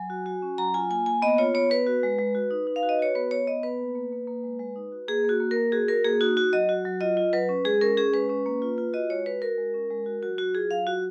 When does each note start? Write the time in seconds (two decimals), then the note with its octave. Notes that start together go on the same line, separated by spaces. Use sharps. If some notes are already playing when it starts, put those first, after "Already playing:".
Already playing: F#3 G#5
0.10 F#4
0.26 F#4
0.42 C#4
0.58 F#3 A#5
0.74 F4 G#5
0.90 A#3 G#5
1.06 A#3 G#5
1.22 B3 D#5
1.38 F4 C#5
1.55 B3 C#5
1.70 B3 B4
1.87 F#4
2.03 G#3
2.19 G#3
2.35 F#4
2.51 D#4
2.67 D#4
2.76 F5
2.83 F#4
2.89 D#5
2.99 F#4 C#5
3.15 B3 B4
3.31 B3 C#5
3.47 B3 D#5
3.63 B3 B4
3.79 A#3
3.95 A#3
4.12 A#3
4.27 A#3
4.43 G#3
4.59 G#3
4.76 D#4
4.92 F#4
5.08 A#3 G#4
5.24 A#3 F#4
5.40 A#3
5.51 A#4
5.56 A#3
5.72 F#4 G#4
5.88 F#4 A#4
6.05 A#3 G#4
6.21 D#4 F#4
6.37 F#4
6.53 F#3 D#5
6.69 F#4
6.85 F#3
7.01 F4 D#5
7.17 F4
7.33 F#3 B4
7.49 C#4
7.65 G#3 G#4
7.81 C#4 A#4
7.97 C#4 G#4
8.14 G#3 B4
8.29 C#4
8.46 A#3
8.62 F4
8.78 F4
8.93 F#4 D#5
9.10 G#3 C#5
9.26 F#4 B4
9.42 F#4 A#4
9.58 G#3
9.74 C#4
9.91 G#3
10.06 F#4
10.23 F#3 F#4
10.38 F#3 F#4
10.54 F4 G#4
10.71 F#3 F5
10.87 F#4